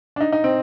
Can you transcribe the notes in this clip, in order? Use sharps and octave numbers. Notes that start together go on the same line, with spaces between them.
D4
D#4
D#4
C4